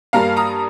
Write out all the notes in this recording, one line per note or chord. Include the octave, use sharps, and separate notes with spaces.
G2 G3 A#3 F5 A#5
A#5 D#6